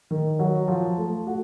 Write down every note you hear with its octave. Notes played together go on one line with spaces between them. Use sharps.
D#3
F#3
F3
A3
F#4